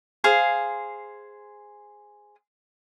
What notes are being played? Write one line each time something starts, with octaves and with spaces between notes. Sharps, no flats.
G#4 C5 F5